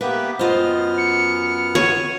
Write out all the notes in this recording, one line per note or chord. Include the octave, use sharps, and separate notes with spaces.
A#3 B3 G4 A#4 B4 E5
F#2 B3 F4 C5 D#5 F6
C#7
C#5 D#7